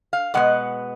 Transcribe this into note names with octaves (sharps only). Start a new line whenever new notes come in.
F5
B2 G#3 B3 F#5